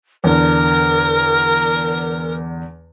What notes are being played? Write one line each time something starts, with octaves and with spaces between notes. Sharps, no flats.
E2 D3 A#4